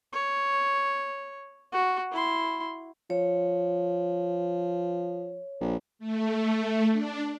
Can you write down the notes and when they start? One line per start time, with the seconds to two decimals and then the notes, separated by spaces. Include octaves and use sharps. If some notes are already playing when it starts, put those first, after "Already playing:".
0.13 C#5
1.72 F#4
2.12 E4 C6
3.10 F3 C#5
5.61 A#1
5.99 A3
6.92 D4